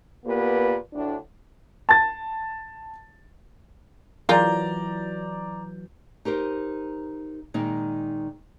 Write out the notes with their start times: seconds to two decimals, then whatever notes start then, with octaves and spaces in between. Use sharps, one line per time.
0.25 A#2 A#3 B3 G4 B4
0.93 D2 A2 D4
1.89 A5 A6
4.29 E3 F#3 F4 G#4 A#4 D5 A#5 G6
6.25 D#4 G4 A#4 C5
7.54 A#2 D#3 G#3 D#4